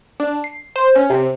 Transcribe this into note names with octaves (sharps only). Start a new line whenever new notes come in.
D4
C7
C5
C#4
C3